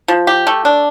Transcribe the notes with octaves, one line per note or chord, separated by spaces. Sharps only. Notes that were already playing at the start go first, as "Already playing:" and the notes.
F3
G4
A3
D4